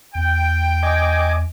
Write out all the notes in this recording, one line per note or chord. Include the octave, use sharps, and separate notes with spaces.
E2 G5
D#5 G#5 D6